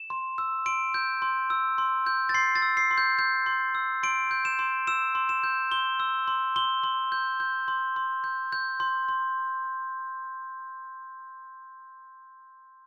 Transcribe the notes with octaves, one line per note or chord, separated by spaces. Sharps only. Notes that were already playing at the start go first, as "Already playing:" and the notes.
Already playing: E7
C6
E6
C6 D7
G6
C6
E6
C6
G6
A6
C6 C7
A6
E6
C7
C6
G6
G6
C6
E6
C6 D7
G6
E7
C6
E6 E7
C6
E7
G6
C6 G7
E6
C6
C6 G7
C6
G6
G6
C6
C6
G6
G6
C6
C6